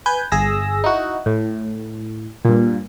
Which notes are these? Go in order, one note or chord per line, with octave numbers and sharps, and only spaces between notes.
B4 G#5 G6
G1 G#4 E6 A#6
D#4 E4 F#4
A2
G2 A#2